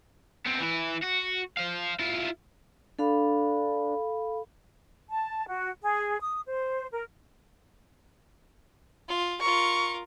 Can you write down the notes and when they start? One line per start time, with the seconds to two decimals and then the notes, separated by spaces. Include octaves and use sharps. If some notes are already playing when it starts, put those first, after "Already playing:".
0.46 B3 C4
0.60 E3 E4
1.02 F#4
1.58 C5 F5
1.99 E4 F4
2.99 D4 A4 F5 B5
5.10 A5
5.48 F#4
5.82 G#4
6.21 D#6
6.47 C5
6.92 A#4
9.08 F4
9.41 F4 A#4 C#6